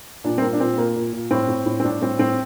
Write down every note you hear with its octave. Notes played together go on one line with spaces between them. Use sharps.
A#2 D4
C4
A#2 A#3
D4
A#2 C4
A#2 A#3
A#2
A#2
A2 C4
A2
A2
C4
A2 D4
A2 C4
A2 C4